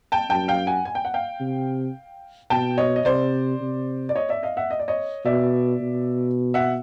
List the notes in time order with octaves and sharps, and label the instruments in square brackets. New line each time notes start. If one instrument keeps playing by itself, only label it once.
[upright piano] G5 A5
[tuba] F#2 [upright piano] G5 A5
[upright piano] F5 G5
F#5 G#5
G#5
G5
F#5
F5 G5
[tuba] C3
[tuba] B2 [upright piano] G5 A5
[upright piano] C#5 D#5
D#5
[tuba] C3 [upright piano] C5 D5
[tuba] C3
[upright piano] D5
C#5 D#5
D5 E5
D#5 F5
E5 F#5
D#5
D5
C#5 D#5
[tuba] B2 [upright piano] D5 E5
[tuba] B2
[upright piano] E5 F#5